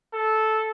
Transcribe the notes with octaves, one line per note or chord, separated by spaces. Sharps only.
A4